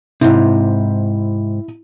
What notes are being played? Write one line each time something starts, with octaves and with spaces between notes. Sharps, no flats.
G#2 C3 E4